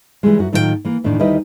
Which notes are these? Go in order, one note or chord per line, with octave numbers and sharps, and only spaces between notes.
E3 G3 G#3
F#2 F#4
A2 D#3 F#3 F4 A4 G5
E3 A#3
F2 A2 D#3 E3 D4
D2 D#3 G3 E4 B4 D#5